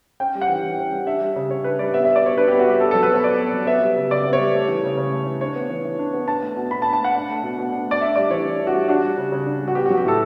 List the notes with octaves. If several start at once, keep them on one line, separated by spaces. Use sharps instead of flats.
C#4 G5
G3
F#5
E3
E3
C#4
G3
D4 E5
G3
C#3
C#3 C#5
D4 B4
G3 D5
B3 E5
G3 E5
D5
B2 C#5
D4 B4
B3 G4
F#4
G3 G4
B3 A4
F#3 A4
B4
B2 C#5
B2 D5
B3
F#3
B3 E5
G3
C#3
C#3 D5
B3
C#5
G3
A3
E3
C#3
C#3
A3
E3
D4 C#5
B3
E3
E3
D4
B3
D4 A5
A3
B2
B2 B5
A5
D4
A5
A3 F#5
D4
A3
B2
B2
D4
A3 D5
D4 E5
G3 D5
E3 C#5
E3
D4
F#4
G3
D4 F#4
G3
C#3
C#3
D4
G3
F#4
B3 G4
F#3 F#4
G4
A2 A4